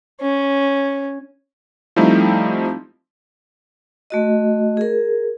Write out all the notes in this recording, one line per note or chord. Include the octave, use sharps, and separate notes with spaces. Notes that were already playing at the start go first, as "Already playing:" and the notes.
C#4
F3 G3 A3 C4 D#4 E4
A3 F#4 D#5
G#4 A#4